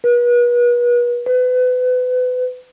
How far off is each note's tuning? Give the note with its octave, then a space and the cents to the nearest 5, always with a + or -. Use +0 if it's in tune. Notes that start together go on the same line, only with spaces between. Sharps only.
B4 -35
B4 +30